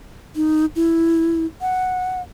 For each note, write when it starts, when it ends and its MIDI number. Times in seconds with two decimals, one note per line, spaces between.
0.36 0.65 63
0.76 1.46 64
1.61 2.22 78